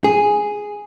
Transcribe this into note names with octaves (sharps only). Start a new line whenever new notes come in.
G#4